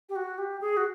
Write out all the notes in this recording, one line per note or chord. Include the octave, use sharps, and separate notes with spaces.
G4
F#4
G4
G#4
F#4